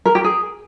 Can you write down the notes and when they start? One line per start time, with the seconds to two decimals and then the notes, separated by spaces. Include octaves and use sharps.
0.06 A#4
0.15 G4
0.24 G#4